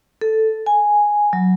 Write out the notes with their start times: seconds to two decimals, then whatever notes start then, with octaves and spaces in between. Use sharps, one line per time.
0.21 A4
0.66 G#5
1.33 F#3